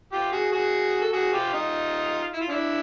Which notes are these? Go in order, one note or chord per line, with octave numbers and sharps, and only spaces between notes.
F4 G4
F#4 G#4
F#4 G#4
A4
F#4 G#4
F4 G4
D#4 F4
E4
F4
D4 E4